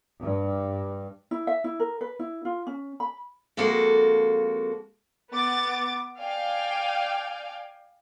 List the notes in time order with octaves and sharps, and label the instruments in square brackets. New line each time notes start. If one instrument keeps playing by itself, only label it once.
[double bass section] G2
[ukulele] E4
E5
E4
A#4
B4
E4
F4
C#4
B5
[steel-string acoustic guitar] F2 G#3 A#3 F#4 A4
[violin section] B3 D6 A6
D5 F5 G5 G#5